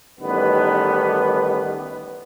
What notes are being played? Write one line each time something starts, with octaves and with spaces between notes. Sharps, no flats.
A1 D#3 G3 B3 B4